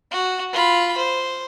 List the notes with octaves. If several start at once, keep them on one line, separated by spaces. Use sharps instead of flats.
F#4
F4 B5
C5